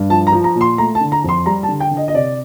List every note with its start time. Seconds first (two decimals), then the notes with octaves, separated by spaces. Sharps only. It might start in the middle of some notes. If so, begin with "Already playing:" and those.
Already playing: G2
0.10 F3 A5
0.27 A#5
0.32 F3
0.44 A#5
0.55 A#2
0.61 C6
0.78 A3 A#5
0.95 A5
1.01 D3
1.12 A#5
1.24 F2 C6
1.46 G3 A#5
1.63 A5
1.68 D3
1.80 G5
1.91 D3
1.97 D#5
2.08 D#5
2.14 C3 D5